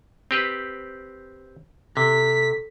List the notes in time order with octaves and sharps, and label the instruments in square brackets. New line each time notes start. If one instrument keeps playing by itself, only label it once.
[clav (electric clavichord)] C4 G4 B4
[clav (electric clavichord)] C3 [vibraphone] A4 [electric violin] B6